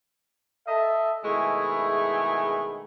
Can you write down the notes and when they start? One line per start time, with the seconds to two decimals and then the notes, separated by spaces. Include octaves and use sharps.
0.67 A4 D#5 E5
1.24 B2 D#3 G#3 A3 E4 G#4